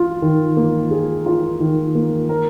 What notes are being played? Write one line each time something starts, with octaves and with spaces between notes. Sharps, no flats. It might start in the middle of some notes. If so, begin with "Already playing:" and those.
Already playing: F4
D#3
A#3
G#4
F4
D#3
A#3
A#4